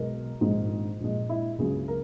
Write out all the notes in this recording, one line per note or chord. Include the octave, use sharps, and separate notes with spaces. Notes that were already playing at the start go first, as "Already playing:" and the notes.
Already playing: B1 B2 G#3 A#4
A#1 G#2 D#3 G#3
A#1 A#2 G#3
E4
C#2 C#3 F#3 G#4
A#4